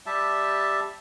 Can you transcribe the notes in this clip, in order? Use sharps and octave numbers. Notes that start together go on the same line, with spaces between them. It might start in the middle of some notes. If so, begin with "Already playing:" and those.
G3 G4 E5 A5